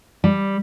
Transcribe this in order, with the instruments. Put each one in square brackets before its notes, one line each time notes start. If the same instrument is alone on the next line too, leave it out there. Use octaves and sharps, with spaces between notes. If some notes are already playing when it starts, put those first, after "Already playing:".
[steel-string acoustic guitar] G3